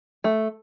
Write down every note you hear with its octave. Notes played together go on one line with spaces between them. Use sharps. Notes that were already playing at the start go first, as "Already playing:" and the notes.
A3